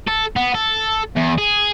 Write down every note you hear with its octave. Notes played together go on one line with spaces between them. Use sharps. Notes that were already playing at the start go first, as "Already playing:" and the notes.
A4
B3
A4
E2
G#4